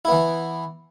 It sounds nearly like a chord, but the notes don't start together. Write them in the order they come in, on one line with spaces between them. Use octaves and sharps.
E4 B3 E3